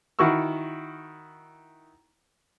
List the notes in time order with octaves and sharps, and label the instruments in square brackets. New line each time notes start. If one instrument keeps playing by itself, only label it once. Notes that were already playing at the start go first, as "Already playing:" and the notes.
[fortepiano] D#3 E4 F#4 C#6 E6